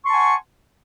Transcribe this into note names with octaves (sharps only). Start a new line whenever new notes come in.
F#5 G#5 A5 C6 C#6